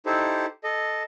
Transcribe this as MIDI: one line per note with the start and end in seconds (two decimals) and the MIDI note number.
0.06 0.46 63
0.06 0.46 64
0.06 0.46 67
0.06 0.46 69
0.06 0.46 72
0.64 1.03 69
0.64 1.03 75